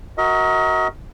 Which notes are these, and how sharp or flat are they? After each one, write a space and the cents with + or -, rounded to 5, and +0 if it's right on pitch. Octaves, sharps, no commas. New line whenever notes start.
F#4 +0 A#4 +0 D#5 +40